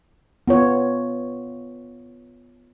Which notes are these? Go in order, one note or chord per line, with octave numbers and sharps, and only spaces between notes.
B3 F4 C#5